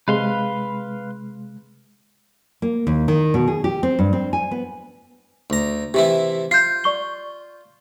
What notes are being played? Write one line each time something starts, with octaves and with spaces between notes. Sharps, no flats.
C3 G#3 B4 F5 C6
A#3
D#2
D#3
B2
G#4
G4
C4
G2
C4
G#5
B3
D2 A#5
C3 E3 E4 G4
F4 G6 C7
D5 C#6 G7